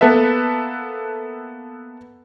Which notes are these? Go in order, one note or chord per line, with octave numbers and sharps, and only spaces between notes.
A#3 B3 A4 B4 E5